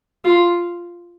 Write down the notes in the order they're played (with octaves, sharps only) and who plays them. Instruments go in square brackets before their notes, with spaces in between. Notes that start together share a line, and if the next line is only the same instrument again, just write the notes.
[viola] F4